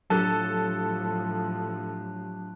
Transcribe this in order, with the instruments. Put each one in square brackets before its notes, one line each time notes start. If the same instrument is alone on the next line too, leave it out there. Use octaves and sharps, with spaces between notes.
[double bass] A2 F3 [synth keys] F#3 D4 G4 [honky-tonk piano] A4 [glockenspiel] A5 F#6